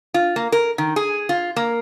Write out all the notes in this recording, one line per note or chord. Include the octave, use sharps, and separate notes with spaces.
F4
A#3
A#4
D#3
G#4
F4
A#3